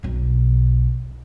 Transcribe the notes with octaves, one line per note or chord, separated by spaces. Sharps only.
B1 B2